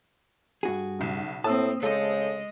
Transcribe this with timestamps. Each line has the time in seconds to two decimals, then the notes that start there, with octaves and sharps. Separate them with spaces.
0.63 G2 F#4 G#4
0.99 B1 C#3
1.44 A2 A#3 C4 A5 D#6 E6
1.83 C#3 G#3 A4 C5 D#5